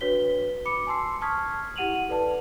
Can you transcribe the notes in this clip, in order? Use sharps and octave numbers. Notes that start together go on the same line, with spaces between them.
D4 F#4 B4 C#5 B6 G7
B5 D6 C#7
G#5 A5 C6 E6 C7
A5 C#6 D#6 F6 G#6 B6
E4 G4 F#5 D#7 F7 F#7
A4 B4 D5 A5